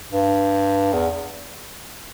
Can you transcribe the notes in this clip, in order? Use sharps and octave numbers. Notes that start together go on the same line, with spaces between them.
G2
E2